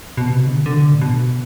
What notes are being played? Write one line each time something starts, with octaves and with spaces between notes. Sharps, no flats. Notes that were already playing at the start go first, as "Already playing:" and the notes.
B2
C3
D3
D3
A2
B2